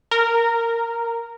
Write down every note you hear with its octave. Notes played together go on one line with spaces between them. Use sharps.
A#4